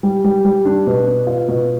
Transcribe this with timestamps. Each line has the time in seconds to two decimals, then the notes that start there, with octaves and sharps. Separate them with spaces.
0.03 G3
0.24 G3
0.45 G3
0.65 D4
0.87 B2
1.07 B3
1.27 F4
1.48 B2